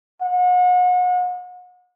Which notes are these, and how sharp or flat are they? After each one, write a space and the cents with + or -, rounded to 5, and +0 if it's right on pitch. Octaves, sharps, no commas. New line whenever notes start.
F#5 -35